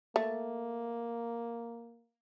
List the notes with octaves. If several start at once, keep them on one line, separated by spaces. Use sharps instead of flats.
A3 A#3